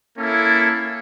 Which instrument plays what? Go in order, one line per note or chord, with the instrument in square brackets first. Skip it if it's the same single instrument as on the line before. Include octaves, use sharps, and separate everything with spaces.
[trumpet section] A#3 C#4 E4 A4